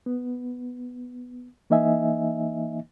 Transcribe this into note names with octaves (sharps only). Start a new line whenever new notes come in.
B3
E3 A#3 D#4 D#5 E5 G#5